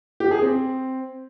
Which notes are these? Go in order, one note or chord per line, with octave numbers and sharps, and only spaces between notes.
G4
G#4
C4